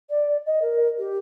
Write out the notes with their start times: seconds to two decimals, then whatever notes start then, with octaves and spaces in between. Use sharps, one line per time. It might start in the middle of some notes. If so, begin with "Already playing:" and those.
0.10 D5
0.46 D#5
0.62 A#4
0.98 G4